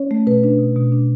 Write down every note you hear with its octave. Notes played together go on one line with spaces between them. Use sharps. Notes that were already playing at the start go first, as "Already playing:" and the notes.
Already playing: C#4 C#5
A3
B2 B4
D4
B2
B2
D4